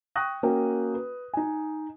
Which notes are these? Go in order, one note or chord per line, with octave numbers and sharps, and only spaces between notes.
G5 C#6 D#6 F#6 A#6
A#3 C#4 F#4 G5
B4
D#4 G#5